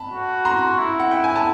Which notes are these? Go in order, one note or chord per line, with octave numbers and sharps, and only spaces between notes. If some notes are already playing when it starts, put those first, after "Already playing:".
Already playing: A5 B5
F#4
A#5 C6
E4
F#5
G5
G#5
A5